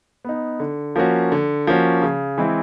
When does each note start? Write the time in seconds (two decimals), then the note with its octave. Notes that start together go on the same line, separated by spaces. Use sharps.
0.25 B3 D#4
0.60 D3
0.96 F3 A#3 C#4 F#4
1.32 D3
1.67 F3 A#3 C#4 F#4
2.02 C#3
2.38 E3 G#3 C4 E4